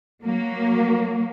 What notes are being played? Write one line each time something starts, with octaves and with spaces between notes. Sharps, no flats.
F#3 A#3